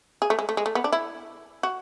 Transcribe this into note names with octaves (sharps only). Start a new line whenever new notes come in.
G#4
A3
G#3
A3
G#3
A3
B3
D4
E4
F#4